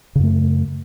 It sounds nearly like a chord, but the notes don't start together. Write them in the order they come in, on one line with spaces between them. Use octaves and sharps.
C#3 F#2 A3